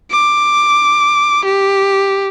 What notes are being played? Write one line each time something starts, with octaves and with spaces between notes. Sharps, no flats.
D6
G4